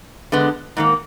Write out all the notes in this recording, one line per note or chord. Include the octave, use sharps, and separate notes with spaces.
D3 G#3 B3
G#2 D#3 A#3